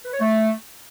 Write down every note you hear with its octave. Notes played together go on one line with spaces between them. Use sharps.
B4
C#5
A3